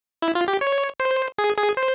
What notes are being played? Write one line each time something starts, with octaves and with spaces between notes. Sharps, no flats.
E4
F4
G4
C#5
C5
G#4
G#4
C5